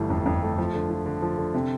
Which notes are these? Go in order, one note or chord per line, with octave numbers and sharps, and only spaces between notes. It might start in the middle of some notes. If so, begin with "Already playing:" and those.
Already playing: G1 E3 G3 A3
F2
F2
A3
F3
D3
F3
D3
F3
D3
C3